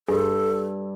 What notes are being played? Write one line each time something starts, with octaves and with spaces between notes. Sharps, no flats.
G2 G#4 A4